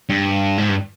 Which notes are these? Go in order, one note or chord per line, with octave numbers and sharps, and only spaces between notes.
G2
G#2
G2